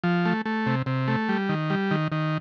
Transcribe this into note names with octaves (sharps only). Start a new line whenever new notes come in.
F3
A3
A3
C3
C3
A3
G3
D#3
G3
D#3
D#3